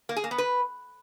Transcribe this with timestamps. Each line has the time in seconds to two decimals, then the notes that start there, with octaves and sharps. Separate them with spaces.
0.09 A#3
0.16 G#4
0.24 A#3
0.31 B3
0.38 B4